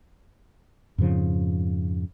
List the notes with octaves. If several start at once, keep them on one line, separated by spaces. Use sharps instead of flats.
F2 G#2 C#3 F3